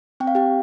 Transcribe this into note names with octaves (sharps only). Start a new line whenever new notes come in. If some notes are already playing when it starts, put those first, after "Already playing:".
C4 G5
F5
G4 G5